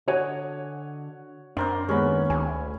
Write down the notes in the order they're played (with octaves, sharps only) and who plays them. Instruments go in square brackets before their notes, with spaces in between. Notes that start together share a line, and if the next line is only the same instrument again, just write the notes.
[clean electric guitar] D3 D#5 G#5 [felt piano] F#4 C#5 F#5
[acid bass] F#2 [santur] C4 A#4 C5 [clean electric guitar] D4 D5
[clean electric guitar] D#2 [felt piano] G#3 B3 [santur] C#4 B5
[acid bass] D2 [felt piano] G#5